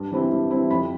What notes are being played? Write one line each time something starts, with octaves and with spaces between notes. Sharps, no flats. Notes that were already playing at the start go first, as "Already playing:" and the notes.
Already playing: G2
E3 G3 C4 E4
G2
E3 G3 C4 E4
F2 B5